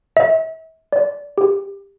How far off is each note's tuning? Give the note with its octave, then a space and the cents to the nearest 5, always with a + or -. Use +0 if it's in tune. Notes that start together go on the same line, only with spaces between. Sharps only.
E5 -40
D5 -20
G4 +20